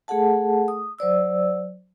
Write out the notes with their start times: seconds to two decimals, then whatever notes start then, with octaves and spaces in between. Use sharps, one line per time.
0.08 A3 G#4 A4 F#5 A5
0.68 D#6
0.99 F#3 C5 D5 E6